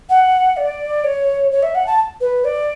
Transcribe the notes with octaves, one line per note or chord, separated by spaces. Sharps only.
F#5
D5
C#5
C#5
E5
F#5
A5
B4
D5